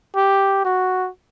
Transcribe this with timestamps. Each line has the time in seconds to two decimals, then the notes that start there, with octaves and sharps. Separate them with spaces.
0.16 G4
0.65 F#4